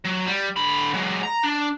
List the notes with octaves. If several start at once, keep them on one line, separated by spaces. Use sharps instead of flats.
F#3
G3
D3 B5
F#3 G#3
A#5
D4